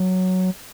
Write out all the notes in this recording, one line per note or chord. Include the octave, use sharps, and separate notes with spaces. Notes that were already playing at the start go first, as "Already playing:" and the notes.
Already playing: F#3